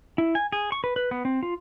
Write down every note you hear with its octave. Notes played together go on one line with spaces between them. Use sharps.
E4
G#5
G#4
C#6
B4
B4
B3
C4
F4